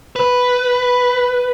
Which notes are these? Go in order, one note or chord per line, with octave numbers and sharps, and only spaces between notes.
B4